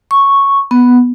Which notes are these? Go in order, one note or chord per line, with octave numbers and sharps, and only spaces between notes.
C#6
B3